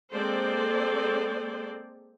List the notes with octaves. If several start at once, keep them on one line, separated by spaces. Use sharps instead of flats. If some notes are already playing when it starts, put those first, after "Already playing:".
G#3 A#3 C4 A4 C5 D5